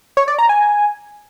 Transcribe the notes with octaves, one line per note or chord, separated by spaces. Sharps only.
C#5
D5
A#5
G#5